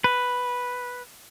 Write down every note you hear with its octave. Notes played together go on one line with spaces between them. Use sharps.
B4